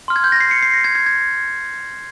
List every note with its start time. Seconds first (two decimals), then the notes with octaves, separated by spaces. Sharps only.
0.08 C6 F6
0.16 G#6
0.24 G6
0.32 A#6
0.40 C7
0.51 C#7
0.63 C7
0.74 A#6
0.84 G#6
0.95 G#6
1.06 G#6